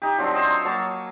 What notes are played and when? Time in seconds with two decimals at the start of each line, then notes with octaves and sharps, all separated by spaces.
0.02 D#4 G4
0.18 F3 F#3 C4 D4
0.33 C5 D5 D#5 C6
0.48 C#5 A#5
0.65 F#3 A#3 C#5 A5